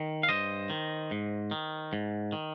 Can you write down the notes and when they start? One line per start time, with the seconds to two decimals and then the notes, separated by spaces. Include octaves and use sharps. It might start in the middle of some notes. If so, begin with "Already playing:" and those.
Already playing: D#3
0.23 F5
0.29 G2 C5 D#5
0.70 D#3
1.11 G#2
1.51 D#3
1.93 G#2
2.32 D#3